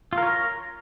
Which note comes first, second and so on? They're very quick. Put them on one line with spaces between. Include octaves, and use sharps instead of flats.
F4 A#4 C#5 A#5